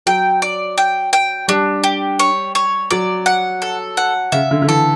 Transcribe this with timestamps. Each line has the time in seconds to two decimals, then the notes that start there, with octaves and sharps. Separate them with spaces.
0.06 F#3 G5
0.42 D5
0.78 G5
1.13 G5
1.48 G3 D4
1.84 G4
2.19 C#5
2.55 C#5
2.91 F#3 D5
3.26 F#5
3.62 A4
3.97 F#5
4.32 C#3 E5
4.51 D3
4.62 D3
4.68 E3 A4